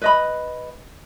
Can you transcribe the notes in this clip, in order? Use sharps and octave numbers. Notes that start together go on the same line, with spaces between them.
B4 D#5 B5